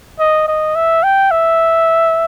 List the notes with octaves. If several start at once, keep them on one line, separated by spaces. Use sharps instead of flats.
D#5
D#5
E5
G5
E5